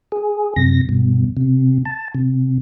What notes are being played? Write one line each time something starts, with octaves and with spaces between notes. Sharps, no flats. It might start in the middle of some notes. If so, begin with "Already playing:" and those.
G#4
F#2 C3 A#6
G2 B2
C3
A5
C3